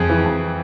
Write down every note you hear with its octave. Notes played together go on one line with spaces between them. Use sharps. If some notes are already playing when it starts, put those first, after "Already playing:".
Already playing: F2 G#4
E3
F2